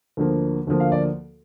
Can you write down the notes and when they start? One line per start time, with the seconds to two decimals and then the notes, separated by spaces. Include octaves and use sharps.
0.17 D2 D3 F3 A#3
0.67 D2 D3 F3 A#3
0.80 F5
0.92 D5